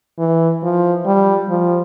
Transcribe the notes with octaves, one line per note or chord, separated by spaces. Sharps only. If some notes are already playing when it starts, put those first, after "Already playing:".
E3
F3
G3
F3